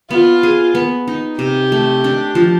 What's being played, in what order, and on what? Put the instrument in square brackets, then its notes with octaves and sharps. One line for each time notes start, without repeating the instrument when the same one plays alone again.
[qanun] B3 [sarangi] F4
[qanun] G#4
B3
D#4
[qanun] C3 [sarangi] G4
[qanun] A3
D4
F3